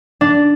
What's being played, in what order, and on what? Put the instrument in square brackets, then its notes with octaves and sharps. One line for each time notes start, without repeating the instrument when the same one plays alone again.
[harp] D4